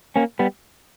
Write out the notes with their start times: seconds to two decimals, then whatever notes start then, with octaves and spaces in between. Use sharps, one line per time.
0.16 A#3 C#4
0.39 G3 B3